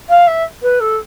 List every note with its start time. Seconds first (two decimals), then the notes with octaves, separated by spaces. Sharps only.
0.09 F5
0.27 E5
0.62 B4
0.80 A4